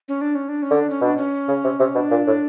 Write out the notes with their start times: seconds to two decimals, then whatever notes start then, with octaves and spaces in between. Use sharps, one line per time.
0.08 C#4
0.21 D4
0.35 C#4
0.49 D4
0.62 C#4
0.71 D3
0.77 D4
0.90 C#4
1.01 B2 D4
1.17 C#4
1.48 C#3
1.64 C3
1.80 C3
1.95 B2 D4
2.11 A#2
2.27 A2